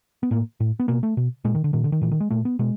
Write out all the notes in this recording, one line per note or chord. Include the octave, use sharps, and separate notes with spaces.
B3
A2 A#3
A2
B3
B2 A#3
A3
B2
A#2 G#3
D#3
D3
A#2 D#3
D3
D#3
A#2 E3
D#3
G#3
A#2 A3
B3
B2 G#3